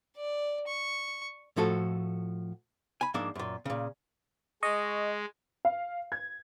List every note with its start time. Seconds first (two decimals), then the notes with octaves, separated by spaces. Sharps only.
0.17 D5
0.67 C#6
1.56 A2 F3 F#4 A4
3.01 G#5 B5
3.14 G#2 F3 A#3 D4 E5
3.35 F#2 A#2
3.65 A#2 C#3
4.63 G#3 D#5 C#6
5.65 F5
6.12 G#6